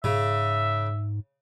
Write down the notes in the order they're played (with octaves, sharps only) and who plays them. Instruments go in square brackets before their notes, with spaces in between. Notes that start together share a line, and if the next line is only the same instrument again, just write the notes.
[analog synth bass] G#2 [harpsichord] C#3 [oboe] E5